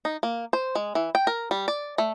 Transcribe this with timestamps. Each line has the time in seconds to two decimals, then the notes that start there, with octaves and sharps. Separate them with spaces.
0.05 D#4
0.23 A#3
0.53 C5
0.75 G#3
0.95 E3
1.15 G5
1.27 A#4
1.51 G3
1.68 D5
1.98 A3